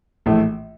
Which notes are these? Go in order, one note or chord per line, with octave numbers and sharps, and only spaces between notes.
A#1 A2 E3 A3